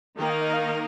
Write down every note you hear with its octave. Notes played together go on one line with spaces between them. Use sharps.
D#3 A#3 D#4 A#4 G5
F5
D#5
F5